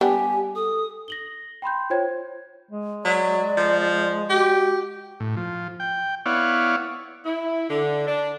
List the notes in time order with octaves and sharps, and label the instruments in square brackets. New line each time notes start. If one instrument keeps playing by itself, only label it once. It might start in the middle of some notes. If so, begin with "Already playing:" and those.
[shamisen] G3 B3 D4 [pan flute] G4 [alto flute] G#5
[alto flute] A4 [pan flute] D#6
[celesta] A#6 F#7 G7
G5 B5 C6 G6
F4 C5 C#5 G5 G#6
[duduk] G#3
[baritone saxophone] F#3 [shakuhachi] D5
[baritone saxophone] F3
[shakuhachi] F#4 [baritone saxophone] G4
[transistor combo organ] A2
F3
G5
B3 E4 C#5 D5 F5 F#5
[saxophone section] E4
D3
D4